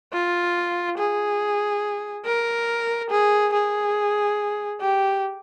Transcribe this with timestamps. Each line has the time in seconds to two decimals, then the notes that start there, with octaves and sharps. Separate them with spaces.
0.13 F4
0.98 G#4
2.25 A#4
3.10 G#4
3.53 G#4
4.81 G4